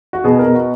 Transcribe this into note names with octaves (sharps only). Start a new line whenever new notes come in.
F#4
B2 G#4
A#4
B2
F#4